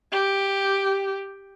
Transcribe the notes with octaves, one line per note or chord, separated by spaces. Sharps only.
G4